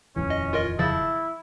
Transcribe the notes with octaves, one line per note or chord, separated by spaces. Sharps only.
D#1 F2 E3 C#4
D#5
F4 A#4 D#5
C#3 F3 E4 A6